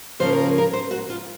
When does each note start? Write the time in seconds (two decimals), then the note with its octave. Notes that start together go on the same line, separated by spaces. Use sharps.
0.20 C#3 F3 A#3 C#4 C5
0.32 A#4
0.46 G#4
0.58 A#4
0.73 C5
0.91 F#4
1.10 F4